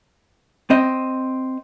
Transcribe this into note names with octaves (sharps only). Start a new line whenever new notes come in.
C4 D#5